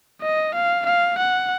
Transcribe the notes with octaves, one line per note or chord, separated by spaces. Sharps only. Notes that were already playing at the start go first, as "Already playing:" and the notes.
D#5
F5
F5
F#5